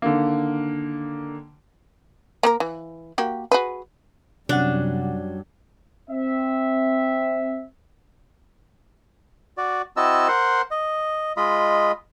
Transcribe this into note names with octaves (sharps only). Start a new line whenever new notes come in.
D3 D#3 A#3
A#3 G4 A#4
E3
A#3 F#4 G4
F#4 G#4 B4
F#2 C3 F#3 G3 C#4 D4 F#5
C4 E5
F#4 D5
C4 E4 F#4 D#5 A5 E6
A#4 C5 F#5 C6
D#5
G#3 F4 D#5 B5